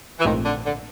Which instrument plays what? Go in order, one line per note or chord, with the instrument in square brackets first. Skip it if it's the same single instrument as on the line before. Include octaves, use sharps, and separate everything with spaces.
[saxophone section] E3
[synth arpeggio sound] A#1 G#2 F3 A3 C4 [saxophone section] D#3
[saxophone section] D3
D3